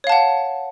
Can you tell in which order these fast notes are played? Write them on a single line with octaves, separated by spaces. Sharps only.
C#5 F5 A5 F#5